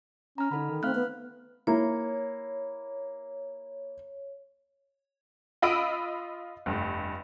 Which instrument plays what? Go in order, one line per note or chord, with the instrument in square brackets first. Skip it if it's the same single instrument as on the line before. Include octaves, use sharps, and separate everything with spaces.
[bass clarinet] C#4 [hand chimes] A#5 F6
[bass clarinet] D3 [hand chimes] D#4 A4 B5
[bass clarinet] D#3
[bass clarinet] A3 [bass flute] C4 [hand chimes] F5 F6 F#6
[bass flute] B3
[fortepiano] A#3 E4 [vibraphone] C#5
[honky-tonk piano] F4 D#5 B5 E6 D7
F1 G2